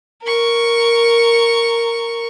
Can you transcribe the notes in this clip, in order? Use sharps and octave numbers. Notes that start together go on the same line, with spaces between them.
A#4 C#6